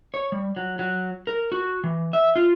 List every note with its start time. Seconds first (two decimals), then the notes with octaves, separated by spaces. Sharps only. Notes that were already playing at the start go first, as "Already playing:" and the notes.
0.14 C#5
0.32 G3
0.56 F#3
0.79 F#3
1.27 A#4
1.52 F#4
1.84 E3
2.13 E5
2.36 F4